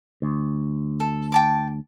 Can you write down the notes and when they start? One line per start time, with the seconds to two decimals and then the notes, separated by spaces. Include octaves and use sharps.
0.22 D2
1.00 A4
1.32 G5 A5 D6